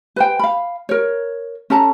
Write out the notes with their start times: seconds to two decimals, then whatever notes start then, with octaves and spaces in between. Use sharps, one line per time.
0.16 B4 C5 G5
0.39 F5 B5
0.89 A#4 C#5
1.70 C#4 A4 A5 A#5